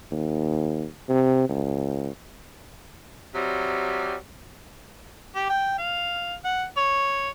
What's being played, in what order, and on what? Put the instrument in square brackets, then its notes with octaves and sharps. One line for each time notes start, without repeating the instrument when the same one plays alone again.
[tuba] D#2
C3
C#2
[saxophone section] C3 F#3 G3
[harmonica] G4
G5
F5
F#5
C#5